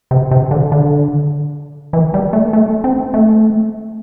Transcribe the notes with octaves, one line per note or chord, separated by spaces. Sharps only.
C3
C3
D3
D3
E3
G3
A3
A3
C4
A3